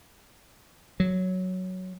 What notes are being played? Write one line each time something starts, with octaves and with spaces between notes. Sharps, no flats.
F#3